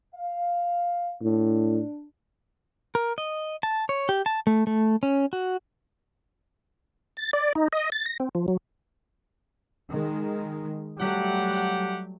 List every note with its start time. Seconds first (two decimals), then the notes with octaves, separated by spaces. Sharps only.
0.15 F5
1.22 A2 D4
2.95 A#4
3.18 D#5
3.63 A5
3.89 C#5
4.09 G4
4.26 A5
4.47 A3
4.67 A3
5.03 C#4
5.33 F#4
7.17 A6
7.33 D5
7.55 D#4
7.73 D#5
7.92 A6
8.06 A#6
8.20 C4
8.35 F3
8.48 F#3
9.91 D#3 G#3
10.98 F#3 G3 A3 G4 F#5